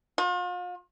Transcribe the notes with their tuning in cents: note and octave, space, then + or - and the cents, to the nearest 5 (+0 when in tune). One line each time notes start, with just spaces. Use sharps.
F4 +40